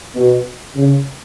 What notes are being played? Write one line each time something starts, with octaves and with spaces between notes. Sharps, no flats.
B2
C#3